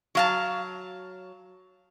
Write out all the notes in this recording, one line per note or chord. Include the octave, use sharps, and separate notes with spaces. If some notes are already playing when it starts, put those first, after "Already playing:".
F#3 F5 A5